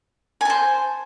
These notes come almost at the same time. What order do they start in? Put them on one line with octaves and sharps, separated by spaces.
G#5 A5 C5